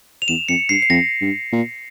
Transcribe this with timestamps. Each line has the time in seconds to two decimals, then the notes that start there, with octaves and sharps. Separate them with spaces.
0.22 F7
0.28 E2 E7
0.49 F2 C#7
0.69 G2 C7
0.82 C7
0.89 F2 A#6
1.21 G2
1.52 A#2